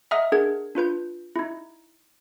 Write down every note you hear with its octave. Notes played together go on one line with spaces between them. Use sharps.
D#5 E5 F#5 A#5 D#6 F6
D4 G#4 A#4 F#5 G#6
D4 F4 B4 G6
D#4 E4